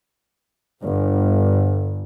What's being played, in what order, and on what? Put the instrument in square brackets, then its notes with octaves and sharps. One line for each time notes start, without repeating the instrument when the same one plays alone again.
[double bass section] G1